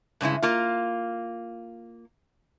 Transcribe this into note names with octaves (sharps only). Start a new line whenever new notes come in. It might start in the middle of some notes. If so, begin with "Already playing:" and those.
G2 C#3 G#3 E4
A#3 F4